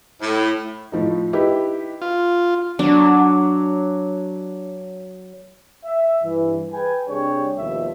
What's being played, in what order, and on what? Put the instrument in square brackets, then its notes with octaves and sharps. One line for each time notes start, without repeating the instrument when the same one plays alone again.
[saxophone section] A2
[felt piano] A2 F3 D#4
D#4 E4 G4 B4
[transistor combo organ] F4
[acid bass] F#3 [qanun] D4
[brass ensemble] E5
G2 E3
G#4 B4 G5 G#5
C3 G3 D4 G#4 C#5 G5
D#2 B2 F3 G3 A3 E5